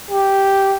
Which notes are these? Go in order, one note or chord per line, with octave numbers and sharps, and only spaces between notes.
G4